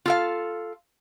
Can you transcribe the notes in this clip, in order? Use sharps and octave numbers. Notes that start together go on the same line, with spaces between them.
F4 A4 F5